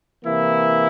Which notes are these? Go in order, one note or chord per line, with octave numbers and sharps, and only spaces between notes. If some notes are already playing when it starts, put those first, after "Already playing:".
C3 E3 A#3 E4